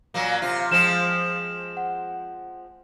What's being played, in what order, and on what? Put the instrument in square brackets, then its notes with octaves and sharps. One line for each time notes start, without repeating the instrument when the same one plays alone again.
[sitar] A#2 F#3 A#3
C3 F4
[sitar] F3 G#3 C4 [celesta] E7
[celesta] F#5